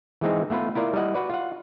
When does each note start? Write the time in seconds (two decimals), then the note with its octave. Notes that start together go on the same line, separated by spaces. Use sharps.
0.21 E3 G#3 C4 D#4
0.50 A3 B3 F4 B4
0.75 E4 F4 A#4 D5
0.93 G3 E4 D#5 F#5
1.14 F#4 B4 D5
1.29 F4 F#5